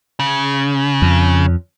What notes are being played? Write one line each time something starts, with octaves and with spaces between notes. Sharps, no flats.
C#3
F2